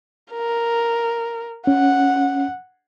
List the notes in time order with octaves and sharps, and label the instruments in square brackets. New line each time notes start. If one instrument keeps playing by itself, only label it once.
[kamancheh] A#4
[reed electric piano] C#4 [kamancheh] F#5